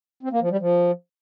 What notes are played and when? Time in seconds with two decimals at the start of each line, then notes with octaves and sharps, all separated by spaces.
0.23 C4
0.32 A#3
0.41 F3
0.51 G3
0.60 F3